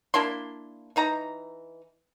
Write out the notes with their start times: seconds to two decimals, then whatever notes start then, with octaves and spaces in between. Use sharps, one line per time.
0.14 A#3 D4 E4 C6
0.96 E3 D#4 A#5